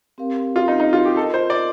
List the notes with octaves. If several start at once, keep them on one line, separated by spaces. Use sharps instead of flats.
C4 G4 A#4 F5
F4
D#4
D#4
F4
G4
F4 A4 A#4 D#5
C5
D5